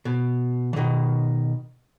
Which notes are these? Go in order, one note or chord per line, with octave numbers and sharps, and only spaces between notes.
B2
E3
B2 D#3